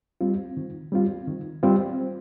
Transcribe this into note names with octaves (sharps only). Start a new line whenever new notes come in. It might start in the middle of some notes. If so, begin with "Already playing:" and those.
G3 C4 F4
D#3
G3 C4 F4
D#3
G3 C4 F4